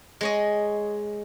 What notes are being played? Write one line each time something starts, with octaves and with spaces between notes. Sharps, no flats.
G#3 C#5 D#5